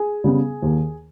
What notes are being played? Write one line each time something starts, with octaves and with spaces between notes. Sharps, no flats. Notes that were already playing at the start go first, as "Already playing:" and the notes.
Already playing: G#4 G#5
C#3 G3 B3
D#2